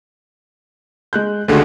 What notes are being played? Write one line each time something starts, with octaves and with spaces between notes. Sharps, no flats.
G#3 F#6 G6
C#2 D3 G#3 A3 F#4